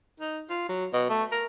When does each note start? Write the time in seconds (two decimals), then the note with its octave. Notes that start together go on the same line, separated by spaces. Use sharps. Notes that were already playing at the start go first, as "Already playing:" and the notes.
0.20 D#4
0.50 F4
0.69 F#3
0.93 B2
1.10 A3
1.32 A#4